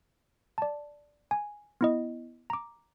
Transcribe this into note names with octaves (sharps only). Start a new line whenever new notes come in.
D5 A5
G#5
B3 E4 D#5
A#5 D6